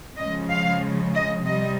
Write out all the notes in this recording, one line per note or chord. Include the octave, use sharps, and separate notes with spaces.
C#3 F3 G#3 D#5
F5
D#5
C3 G3 D#5